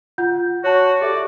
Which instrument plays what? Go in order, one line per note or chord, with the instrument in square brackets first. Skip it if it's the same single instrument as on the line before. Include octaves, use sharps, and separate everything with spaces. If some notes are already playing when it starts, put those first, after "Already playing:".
[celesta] F4 F#5 G6
[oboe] F#4 [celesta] C#5 A5
[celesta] G4 A4 E5 [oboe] D5